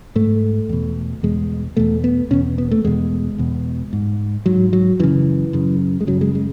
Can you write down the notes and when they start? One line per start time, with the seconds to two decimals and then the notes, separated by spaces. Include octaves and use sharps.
0.15 G#2 A3
0.69 E2 B2
1.23 E2 B2 G#3
1.77 E2 B2 A3
2.04 B3
2.31 E2 B2 C#4
2.58 B3
2.71 A3
2.85 E2 B2 G#3
3.38 E2 B2
3.93 G#2
4.46 G#2 F#3
4.73 F#3
4.99 F#2 C#3 E3
5.53 F#2 C#3
6.01 G#3
6.07 F#2 C#3 F#3
6.21 G#3
6.35 G#3